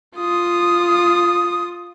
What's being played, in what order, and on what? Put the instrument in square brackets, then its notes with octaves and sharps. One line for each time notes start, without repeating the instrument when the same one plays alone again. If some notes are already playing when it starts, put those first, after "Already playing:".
[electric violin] F4 D#6